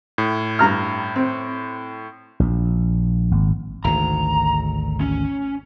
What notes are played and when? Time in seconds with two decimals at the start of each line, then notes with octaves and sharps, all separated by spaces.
0.18 A2
0.59 G2 A#5 F6
1.16 C4
2.40 A#1
3.31 G#1
3.84 G#1 D2 A#5
5.01 C#4